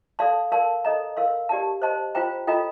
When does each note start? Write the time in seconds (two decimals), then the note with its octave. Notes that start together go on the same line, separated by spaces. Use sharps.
0.19 A4 D5 F5 A5 C6
0.52 A#4 D5 F5 A5 C6
0.85 A4 D#5 A#5
1.17 A#4 F5 C6
1.49 G4 D5 A5
1.82 C5 D#5 A5 C6
2.15 F4 C5 G5 A#5
2.47 F4 A4 D#5 G5 A#5